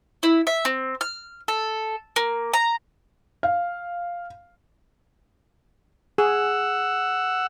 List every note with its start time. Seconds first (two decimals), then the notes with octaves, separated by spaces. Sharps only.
0.23 E4
0.47 E5
0.65 C4
1.01 F6
1.48 A4
2.16 A#3
2.53 A#5
3.43 F5
6.18 G#4 F#5 E6